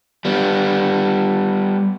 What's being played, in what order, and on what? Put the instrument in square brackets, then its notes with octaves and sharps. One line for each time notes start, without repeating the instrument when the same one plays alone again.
[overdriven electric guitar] G3 B3